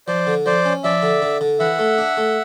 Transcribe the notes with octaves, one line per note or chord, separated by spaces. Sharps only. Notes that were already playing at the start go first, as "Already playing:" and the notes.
F3 C5 D5
D3
F3 C5 D5
C#4
F3 D5 E5
D3
D3
D3
E3 E5 F#5
A3
D4
A3